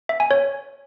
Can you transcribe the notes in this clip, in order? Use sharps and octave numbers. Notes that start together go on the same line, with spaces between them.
E5
G#5
C#5